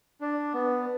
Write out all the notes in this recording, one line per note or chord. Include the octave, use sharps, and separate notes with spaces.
D4
B3